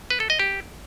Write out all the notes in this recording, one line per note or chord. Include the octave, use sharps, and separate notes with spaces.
B4
A4
D#5
G4